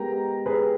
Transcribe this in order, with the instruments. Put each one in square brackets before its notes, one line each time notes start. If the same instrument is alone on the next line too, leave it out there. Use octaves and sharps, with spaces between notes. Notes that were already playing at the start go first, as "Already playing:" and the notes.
Already playing: [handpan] G#3 B3 G4 A#4 [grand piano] G5 A#5
[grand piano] G#4 B4